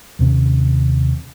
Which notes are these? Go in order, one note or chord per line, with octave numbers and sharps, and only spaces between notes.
D#2 C3 C#4